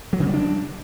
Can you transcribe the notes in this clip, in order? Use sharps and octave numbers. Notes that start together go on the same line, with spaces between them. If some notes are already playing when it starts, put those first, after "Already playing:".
F#3
C#3
G3
D4